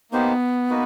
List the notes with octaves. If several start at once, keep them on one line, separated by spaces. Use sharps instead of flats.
A#3 B3 D#4 G4 C5
A#3 D#4 F#4 B4